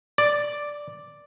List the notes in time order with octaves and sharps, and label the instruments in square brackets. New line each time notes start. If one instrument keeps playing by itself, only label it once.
[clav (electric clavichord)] D5